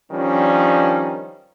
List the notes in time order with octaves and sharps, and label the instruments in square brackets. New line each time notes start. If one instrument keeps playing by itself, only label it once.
[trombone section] D#3 F3 G3 C#4 D4